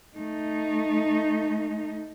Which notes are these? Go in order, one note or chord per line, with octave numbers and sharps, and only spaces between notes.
A3 D#4